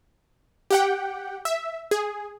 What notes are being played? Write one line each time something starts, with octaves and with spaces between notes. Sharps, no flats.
G4 F#5 G5
E5
G#4